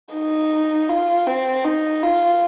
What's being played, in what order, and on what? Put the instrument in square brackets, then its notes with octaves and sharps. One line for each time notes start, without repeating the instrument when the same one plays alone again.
[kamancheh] D#4
F4
C4
D#4
F4